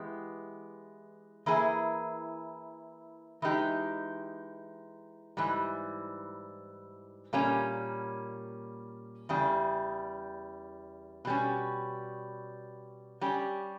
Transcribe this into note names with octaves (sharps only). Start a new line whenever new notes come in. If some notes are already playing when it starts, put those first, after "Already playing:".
Already playing: E3 G#3 B3 G4
E3 A#3 E4 G#4
E3 G#3 D#4 G4
G#2 E3 G3
A#2 G3 A#3 C#4
E2 C#3 G3
B2 G3 C#4
G3 C#4 G4